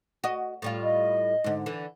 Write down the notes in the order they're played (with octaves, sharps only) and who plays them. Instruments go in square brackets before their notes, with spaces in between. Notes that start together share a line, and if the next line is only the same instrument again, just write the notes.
[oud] F#4 D#5
A2 G3 F4
[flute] D#5
[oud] G#2 D3
D3 E3